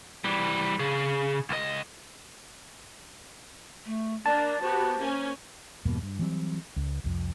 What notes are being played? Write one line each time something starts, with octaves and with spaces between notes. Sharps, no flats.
E3 G3
C#3 G#4
C#2 D#5
A3
A#3 D4 D5 A5
B3 F#4 G4 C5
A#3 C#4 G#5
E2 G2 B2 A#3
G2
E3 F#3 G3 C4
C#2
C2 F2